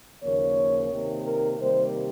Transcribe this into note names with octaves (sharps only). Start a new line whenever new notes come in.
D#2 C#3 F3 A#3 C#5
C3 D#3 A#3
A#4
C3 D#3 G3 A#3 C5